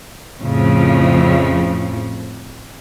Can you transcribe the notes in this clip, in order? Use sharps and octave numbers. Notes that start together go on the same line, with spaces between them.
F2 A2 C#3 F3